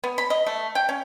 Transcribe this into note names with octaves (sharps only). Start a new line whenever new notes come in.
B3
B5
D#5
A3
G5
C#4